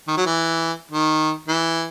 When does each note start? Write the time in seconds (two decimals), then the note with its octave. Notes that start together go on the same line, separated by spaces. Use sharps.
0.07 D#3
0.17 F#3
0.26 E3
0.91 D#3
1.48 E3